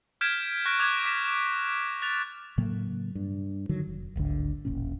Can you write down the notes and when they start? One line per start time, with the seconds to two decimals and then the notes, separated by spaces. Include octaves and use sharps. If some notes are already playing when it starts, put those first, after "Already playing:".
0.21 F6 G6 G#6 B6 D7 E7
0.66 C#6 F#6 A#6 D7
0.79 D6 G#6 F7
1.05 D6 B6 E7
2.02 F#6 A6 F7
2.58 A2 C#3 F#3 A#3
3.15 G2
3.69 D3 D#3 F#3
3.87 F1
4.16 D1 G#1 D2 D3
4.65 E1 A1 A#2 C#4